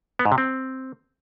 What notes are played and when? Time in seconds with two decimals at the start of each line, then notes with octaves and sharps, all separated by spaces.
0.19 B3
0.26 G#2
0.32 C3
0.38 C4